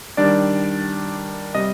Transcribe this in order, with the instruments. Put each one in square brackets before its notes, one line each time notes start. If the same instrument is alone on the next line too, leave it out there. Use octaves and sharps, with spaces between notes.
[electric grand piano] D#3 G3 D4 D5
C3 G3 D#5